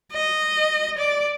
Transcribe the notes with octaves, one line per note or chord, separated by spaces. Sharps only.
D#5
D5